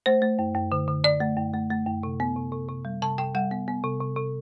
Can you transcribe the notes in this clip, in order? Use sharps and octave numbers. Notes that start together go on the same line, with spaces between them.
A3 C5
A3
F#2
F#2
D3
D3
D3 D5
A3
F#2
A3
A3
F#2
C3
B3
C3
C3
C3
G3
C3 A5
C3 G5
G3 F#5
B3
B3
C3
C3
C3